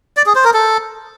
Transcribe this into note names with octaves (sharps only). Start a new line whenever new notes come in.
D5
G#4
C5
A#4
A4